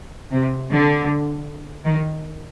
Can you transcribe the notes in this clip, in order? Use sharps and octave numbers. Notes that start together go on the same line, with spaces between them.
C3
D3
D#3